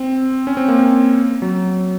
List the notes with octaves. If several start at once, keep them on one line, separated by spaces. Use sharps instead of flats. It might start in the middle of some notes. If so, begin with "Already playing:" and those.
Already playing: C4
C#4
C4
A#3
C4
F#3